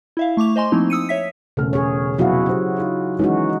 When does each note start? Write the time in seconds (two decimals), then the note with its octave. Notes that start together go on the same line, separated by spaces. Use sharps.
0.17 E4 E5 F5
0.37 A3 C#6 D6 F7
0.56 C5 D#5 G#5 C6
0.72 F3 A3 A#3 C4 D#4 E4
0.90 D#6 E6 C#7 D#7
1.09 C#5 E5 B6
1.57 E1 C#3 A3 F6
1.73 G#4 C#5
2.18 F1 B2 F#3 E4 F#4 F5
2.49 G4 G#4 C5
2.78 D#4 F4
3.19 D#3 E3 G#3 C#4 D#4 F#4